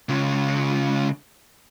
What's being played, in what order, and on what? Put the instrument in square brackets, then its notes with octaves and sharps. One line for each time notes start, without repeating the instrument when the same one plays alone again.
[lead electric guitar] C#2 C#3